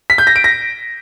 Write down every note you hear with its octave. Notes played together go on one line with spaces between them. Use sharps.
B6
G6
A#6
D7
A#6